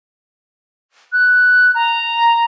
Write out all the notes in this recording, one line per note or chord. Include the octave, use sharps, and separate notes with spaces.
F#6
A#5